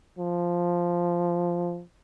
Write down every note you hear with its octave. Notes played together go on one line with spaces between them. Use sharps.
F3